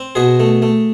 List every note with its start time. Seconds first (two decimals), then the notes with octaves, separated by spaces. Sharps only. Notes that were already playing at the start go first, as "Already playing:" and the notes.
Already playing: C4
0.15 B2 F#4 G#4
0.40 A3
0.62 A3